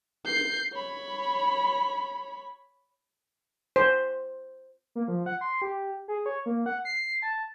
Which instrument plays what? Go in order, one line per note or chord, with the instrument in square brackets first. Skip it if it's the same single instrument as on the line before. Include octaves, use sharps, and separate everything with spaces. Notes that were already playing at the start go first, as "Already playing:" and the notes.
[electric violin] G6 C7
C#5 B5
[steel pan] C5
[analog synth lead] A#3
F3
F#5
C6
G4
G#4
C#5
A#3
F#5
C7
A5